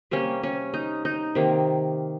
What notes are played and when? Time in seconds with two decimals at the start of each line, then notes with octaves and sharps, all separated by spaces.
0.11 C3 G3 A#3 C#4
0.43 C#4
0.74 D#4
1.05 D#4
1.35 C3 D#3 A#3